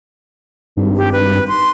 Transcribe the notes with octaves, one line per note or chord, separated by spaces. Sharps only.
G#1 G2
G4
B4
C6